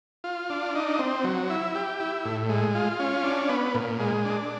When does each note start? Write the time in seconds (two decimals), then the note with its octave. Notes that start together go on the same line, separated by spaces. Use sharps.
0.24 F4
0.50 D4
0.75 D#4
0.99 C4
1.24 F#3
1.50 E4
1.75 G4
2.00 E4
2.25 A2
2.49 G#3
2.75 F4
3.00 C#4
3.24 D4
3.49 B3
3.74 A#2
4.00 G#3
4.25 D4